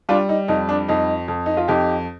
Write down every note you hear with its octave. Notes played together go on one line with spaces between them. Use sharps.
G3 D4 F4
D#4
F2 D#4
D4
F2 D#4
F2
D#4
F4
F2 D#4 G4